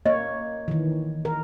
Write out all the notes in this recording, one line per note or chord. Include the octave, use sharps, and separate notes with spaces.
A#3 C#5 D#5
D#3 E3
A#4